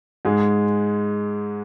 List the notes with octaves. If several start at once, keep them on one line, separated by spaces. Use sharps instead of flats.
G#2 G#3